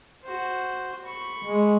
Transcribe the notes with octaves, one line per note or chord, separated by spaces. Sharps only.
F#4 C5
B5 C#6
G#3